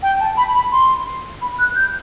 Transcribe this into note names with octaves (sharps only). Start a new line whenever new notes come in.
G5
A5
B5
B5
C6
B5
F#6
G6